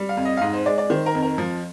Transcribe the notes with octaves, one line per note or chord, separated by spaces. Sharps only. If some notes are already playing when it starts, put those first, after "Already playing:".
Already playing: G3
F5
F2
D#5
F5
G#2 D#5
C5
G#3 D5
D5
D#3 C5
A#4
F2
A#4
F3